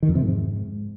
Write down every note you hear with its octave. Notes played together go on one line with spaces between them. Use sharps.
D#3
F2
C3
G#2